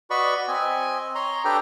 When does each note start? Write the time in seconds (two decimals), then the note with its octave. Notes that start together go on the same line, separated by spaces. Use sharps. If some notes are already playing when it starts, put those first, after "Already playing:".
0.10 F#4 B4 D5 D#5 B5 C#6
0.48 C4 D#5 G#5
1.15 C#5 A#5 C6
1.45 D4 G4 A4 B4 G5 A#5